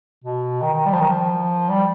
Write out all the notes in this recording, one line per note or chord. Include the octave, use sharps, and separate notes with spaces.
B2
D#3
D#3
G3
F3
D#3
F3
G3